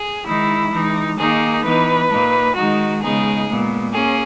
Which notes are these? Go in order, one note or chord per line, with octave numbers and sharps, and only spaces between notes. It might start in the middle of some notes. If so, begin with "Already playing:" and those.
Already playing: G#4
D#3 G#3 D#4 E4
E3 G#3 D#4
D#3 A#3 D#4 G#4
E3 B3 D#4 B4
A#2 A#3 D#4
D#3 G#3 D#4 F#4
C#3 G#3 B3 D#4 G#4
A#2 G#3 B3
A#3 C#4 G#4